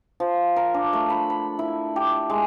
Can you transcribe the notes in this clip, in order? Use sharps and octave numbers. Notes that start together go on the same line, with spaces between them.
F3
A#4
D4
A3
B5
B5
E4
G4
G#3